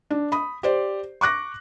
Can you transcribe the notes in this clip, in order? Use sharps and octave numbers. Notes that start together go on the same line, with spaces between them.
D4
B5 D#6
G4 C5 D5
C#6 D6 F#6 A#6